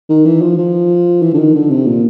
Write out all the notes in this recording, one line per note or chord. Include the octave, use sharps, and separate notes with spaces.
D#3
E3
F3
F3
E3
D3
D#3
D3
C3
A#2